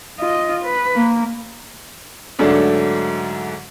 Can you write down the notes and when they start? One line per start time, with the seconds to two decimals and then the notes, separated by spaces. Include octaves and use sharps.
0.19 F4 D#5
0.65 B4
0.95 A#3
2.39 G#2 D3 F#3 A3 D4